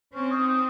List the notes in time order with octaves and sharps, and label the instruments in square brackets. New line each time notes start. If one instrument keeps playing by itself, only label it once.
[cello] C4 [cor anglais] C#4
[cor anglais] D#4
D#4